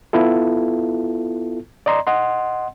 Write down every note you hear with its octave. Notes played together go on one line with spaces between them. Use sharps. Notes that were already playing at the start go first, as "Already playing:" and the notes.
B3 E4 F4 A4
D5 D#5 A#5 C6
D#5 F#5 C6